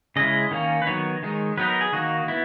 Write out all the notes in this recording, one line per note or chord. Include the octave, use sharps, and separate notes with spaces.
C#3 G#3 C#4 E4 D#5
D#3 A#3 C#4
B4
D#3 F#3 B3 D#4 C#5
D#3 G#3 D#4
F#3 B3 D#4 B4
A#4
G#4
D#3 A#3 D#4 F#4
B3 E4